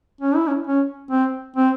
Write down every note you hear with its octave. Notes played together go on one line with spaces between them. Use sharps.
C#4
E4
C#4
C#4
C4
C4